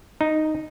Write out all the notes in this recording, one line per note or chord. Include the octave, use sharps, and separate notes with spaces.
D#4